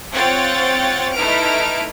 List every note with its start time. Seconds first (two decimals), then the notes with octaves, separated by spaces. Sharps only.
0.14 C4 F4 C#5 F#5 G5 A6
1.14 A3 D#4 E4 B4 F6 D7